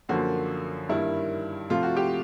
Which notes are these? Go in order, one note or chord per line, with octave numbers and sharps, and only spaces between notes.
F#2 D3 F3 A#3 F#4
G2 D#3 G3 A#3 E4
C3 F3 A3 F4
F#4
G4